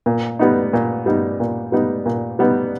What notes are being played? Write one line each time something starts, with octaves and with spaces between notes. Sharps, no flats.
A#2
G3 B3 D#4
A#2
G3 B3 D#4
A#2
G3 B3 D#4
A#2
G3 B3 D#4